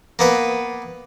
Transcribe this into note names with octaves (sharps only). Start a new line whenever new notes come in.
A#3 B3 B4